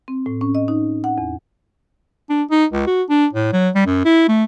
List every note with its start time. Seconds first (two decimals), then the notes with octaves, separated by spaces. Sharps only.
0.08 C4
0.26 A2
0.41 C#4
0.55 D#5
0.68 D#4
1.04 F#5
1.18 E2
2.30 D4
2.51 D#4
2.73 C#2
2.87 F#4
3.10 D4
3.33 A2
3.53 F#3
3.75 G3
3.86 F#2
4.05 E4
4.29 A3